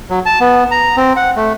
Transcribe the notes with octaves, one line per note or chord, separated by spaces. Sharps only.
F#3
A5
B3
A#5
C4
F#5
A3